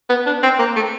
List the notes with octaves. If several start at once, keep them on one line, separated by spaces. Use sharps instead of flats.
B3
D4
C4
A#3
A3